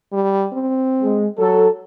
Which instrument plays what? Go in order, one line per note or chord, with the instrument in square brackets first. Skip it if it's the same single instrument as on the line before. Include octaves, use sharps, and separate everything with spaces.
[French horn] G3
C4
[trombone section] G#3
[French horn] F#3 [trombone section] A4